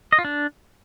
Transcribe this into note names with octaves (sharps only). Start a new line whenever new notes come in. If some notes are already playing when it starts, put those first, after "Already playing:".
D#5
F4
D4